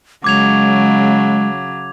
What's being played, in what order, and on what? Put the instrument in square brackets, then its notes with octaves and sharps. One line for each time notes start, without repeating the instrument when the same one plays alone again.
[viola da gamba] C#3 F#3 [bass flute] G#3 [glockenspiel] D6 G#6 F7